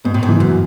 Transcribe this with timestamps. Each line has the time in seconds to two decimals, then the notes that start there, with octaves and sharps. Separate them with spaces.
0.04 G#2 B3
0.14 A2
0.23 G#2
0.29 E3
0.40 F#2